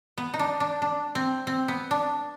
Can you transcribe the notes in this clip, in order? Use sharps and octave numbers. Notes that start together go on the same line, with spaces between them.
B3
D#4
D4
D4
D4
C4
C4
B3
D4